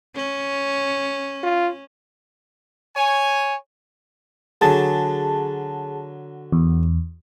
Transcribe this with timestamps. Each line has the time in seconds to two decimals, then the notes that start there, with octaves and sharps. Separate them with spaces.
0.16 C#4
1.43 F4
2.96 C#5 G#5
4.61 D3 F#3 G#4 A5
6.52 E2